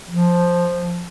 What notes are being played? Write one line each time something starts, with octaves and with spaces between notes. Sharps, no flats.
F3